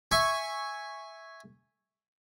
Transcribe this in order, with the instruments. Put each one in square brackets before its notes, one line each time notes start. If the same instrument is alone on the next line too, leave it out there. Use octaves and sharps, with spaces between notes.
[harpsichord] E5 G#5 C#6